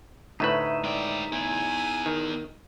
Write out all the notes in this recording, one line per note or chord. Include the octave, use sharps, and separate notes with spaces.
D2 A2 D#4 B4 E5
G#3 D5 G5
B3 E4 G#5
D#3